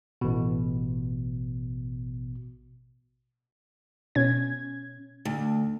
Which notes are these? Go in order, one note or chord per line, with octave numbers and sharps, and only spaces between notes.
A1 B2
B2 C#4 G#6
D2